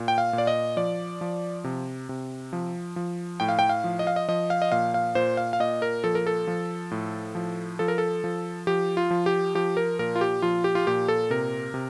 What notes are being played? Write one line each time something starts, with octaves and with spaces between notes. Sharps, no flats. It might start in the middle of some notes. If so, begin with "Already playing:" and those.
Already playing: A#2
G5
F5
A#2
D5
D#5
F3 D5
F3
C3
C3
F3
F3
A2 G5
F5
G5
F5
F3
D#5
F5
D#5
F3 D#5
F5
D#5
A#2 F5
F5
A#2 C5
F5
F5
A#2 D#5
A#4
F3 A4
A#4
A4
F3
A2
F3
F3 A4
A#4
A4
F3
F3 G4
F4
F3
G4
F3 G4
A#4
A#2 A#4
F4
G4
F3 F4
G4
F4
A#2 G4
A4
C3 A#4
C3